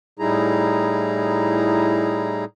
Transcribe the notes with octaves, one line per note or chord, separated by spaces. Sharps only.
A2 G3 D#4 E4 G#4 A#5